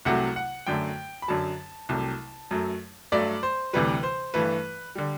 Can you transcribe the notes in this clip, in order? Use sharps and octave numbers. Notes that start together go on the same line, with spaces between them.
C2 C3 F#3 A3 F#5
F#5
F#2 D3 A3 G5
B5
F#2 D3 F#3 A5
C2 C3 F#3 A3 A5
F#2 F#3 A3
G2 F#3 A3 D5
C5
D2 C3 E3 G3 B4
C5
G2 E3 A3 B4
D3 G3